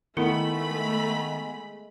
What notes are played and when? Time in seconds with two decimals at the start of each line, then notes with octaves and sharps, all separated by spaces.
0.17 D#3 G#3 A3 B3 E4 A#4 B5